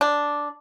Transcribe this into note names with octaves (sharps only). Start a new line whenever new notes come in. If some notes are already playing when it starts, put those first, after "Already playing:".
D4